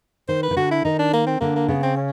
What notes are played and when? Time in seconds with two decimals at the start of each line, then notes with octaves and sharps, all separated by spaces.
0.29 D#3 C5
0.43 B4
0.51 D#3
0.56 D3 F#4
0.71 E4
0.85 D#3 D#4
0.99 D4
1.13 A#3
1.27 C4
1.40 D3 A#3
1.56 A#3
1.68 C#3 B3
1.83 C4
1.97 C#4